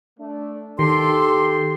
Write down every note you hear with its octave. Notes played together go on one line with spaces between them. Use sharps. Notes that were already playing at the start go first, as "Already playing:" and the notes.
A3 D4
D#2 D#3 G4 A4 C6